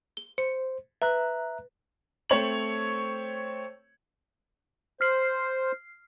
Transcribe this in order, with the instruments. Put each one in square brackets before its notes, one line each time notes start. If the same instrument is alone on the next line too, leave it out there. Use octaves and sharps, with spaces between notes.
[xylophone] G7
[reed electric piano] C5 [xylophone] C#7
[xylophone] B4 [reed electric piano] E5 A#5 F#6
[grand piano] A3 C4 C#5 C#6 F#7
[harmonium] C5 [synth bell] F6 C7